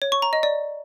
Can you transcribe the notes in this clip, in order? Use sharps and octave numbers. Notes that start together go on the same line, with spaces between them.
C#5
C#6
A#5
D#5
D5